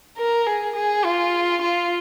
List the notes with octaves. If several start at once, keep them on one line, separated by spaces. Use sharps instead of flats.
A#4
G#4
G#4
F4
F4